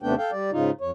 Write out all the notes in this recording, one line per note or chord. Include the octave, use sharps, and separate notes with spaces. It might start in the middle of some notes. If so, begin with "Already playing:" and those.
D#2 C3 A3 B3 D4 G5
A4 F5 G5
G3 D5
G#2 C#3 D#4 F4
F2 C#5